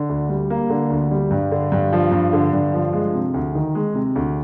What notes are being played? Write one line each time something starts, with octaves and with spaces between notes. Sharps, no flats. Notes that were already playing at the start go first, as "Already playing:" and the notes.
Already playing: D3
D2
G3
A#3
D3
D2
G3
G2
D3
G2
F3
G2
D3
G2
F3
G#3
C3
D2
D#3
G#3
C3
D2